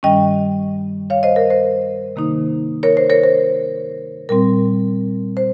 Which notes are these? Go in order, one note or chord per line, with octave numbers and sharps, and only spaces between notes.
G2 D#3 G3 C#4 D#5 G5
C#5 F5
C5 D#5
A#4
C5
C3 D#3 A#3 D#4
A#4 C#5
C5
A#4 C#5
C5
A#2 G3 C4 A#4
C5